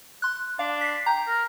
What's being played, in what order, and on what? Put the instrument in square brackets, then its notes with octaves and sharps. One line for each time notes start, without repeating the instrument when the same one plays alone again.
[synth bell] C6 F#6
[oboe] D4 [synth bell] F5
[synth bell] B6 C7
[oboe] G5 [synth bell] A#5
[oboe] A#4